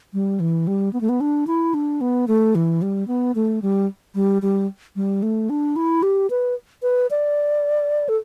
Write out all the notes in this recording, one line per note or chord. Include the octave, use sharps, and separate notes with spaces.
G3
E3
G3
B3
A3
B3
D4
E4
D4
B3
A3
E3
G3
B3
A3
G3
G3
G3
G3
A3
D4
E4
G4
B4
B4
D5
A4